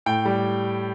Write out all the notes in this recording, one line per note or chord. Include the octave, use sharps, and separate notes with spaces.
A2 G5
G3